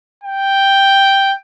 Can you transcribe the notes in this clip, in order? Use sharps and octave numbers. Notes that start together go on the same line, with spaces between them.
G5